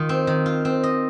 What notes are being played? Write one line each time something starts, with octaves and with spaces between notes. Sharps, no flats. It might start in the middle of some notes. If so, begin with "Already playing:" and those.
Already playing: D#3 F4
C4
D#3
F4
C4
D#5